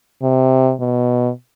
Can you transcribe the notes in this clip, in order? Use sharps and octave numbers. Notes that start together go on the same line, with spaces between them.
C3
B2